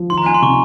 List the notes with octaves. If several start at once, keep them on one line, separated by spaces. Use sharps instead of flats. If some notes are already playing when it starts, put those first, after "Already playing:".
Already playing: F3
D#3 C6
A#5
D#4 G#5
C6
C3 C#6